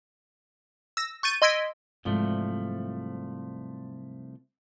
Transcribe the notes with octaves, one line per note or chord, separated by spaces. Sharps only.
E6 A#6
C#6 G6 A6 D#7
D#5 C6 E6 G#6 B6 D7
C2 G#2 F3 F#3 A3